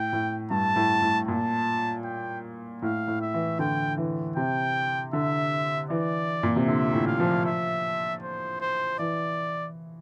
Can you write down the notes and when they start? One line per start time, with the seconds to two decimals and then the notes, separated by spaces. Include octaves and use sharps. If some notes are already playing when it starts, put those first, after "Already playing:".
Already playing: A2 G5
0.13 A2
0.51 G2 A5
0.76 A2
1.02 A2
1.28 A#2 A5
2.05 G5
2.82 A2 F5
3.08 A2
3.21 E5
3.34 E3
3.59 D3 G5
3.97 E3
4.36 C3 G5
5.13 D3 E5
5.90 E3 D5
6.43 A#2
6.56 C3
6.68 D3 E5
6.93 A2
7.07 F5
7.20 F3
7.45 E5
8.23 C5
8.61 C5
8.99 E3 D5